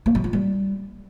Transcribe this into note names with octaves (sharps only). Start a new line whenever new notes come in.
A#3
F#3
F4
G3